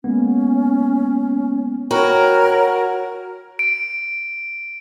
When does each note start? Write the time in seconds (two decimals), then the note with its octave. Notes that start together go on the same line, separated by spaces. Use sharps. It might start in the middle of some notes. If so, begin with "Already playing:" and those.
0.04 G#3 A#3 B3 C#4
1.91 F#4 A#4 C#5 G5 A#5 B5
3.59 D7